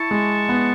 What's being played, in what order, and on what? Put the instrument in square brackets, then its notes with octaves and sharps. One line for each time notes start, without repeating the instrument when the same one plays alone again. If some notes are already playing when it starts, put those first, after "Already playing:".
Already playing: [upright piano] E4 [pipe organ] A5 C#6
[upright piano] G#3
B3